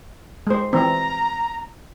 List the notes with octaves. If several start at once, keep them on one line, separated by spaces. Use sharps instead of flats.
G#3 C5
E3 C4 A#5